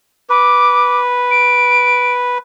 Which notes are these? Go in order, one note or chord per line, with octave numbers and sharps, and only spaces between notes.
B4 D6
D7